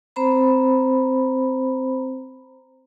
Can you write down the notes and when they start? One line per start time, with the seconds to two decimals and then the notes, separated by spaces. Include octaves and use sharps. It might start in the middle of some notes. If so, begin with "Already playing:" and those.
0.16 C4 C5 A#5 B5